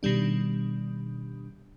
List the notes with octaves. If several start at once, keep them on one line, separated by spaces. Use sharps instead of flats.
B2 D#3 G3 D4